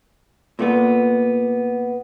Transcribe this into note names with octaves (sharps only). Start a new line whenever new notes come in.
A#2 A3 B3